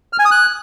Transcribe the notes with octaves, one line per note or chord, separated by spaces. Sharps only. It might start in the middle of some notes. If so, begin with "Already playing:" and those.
F6
G#5
D#6
F#6